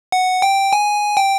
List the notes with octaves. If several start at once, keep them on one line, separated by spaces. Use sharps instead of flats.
F#5
G5
G#5
G5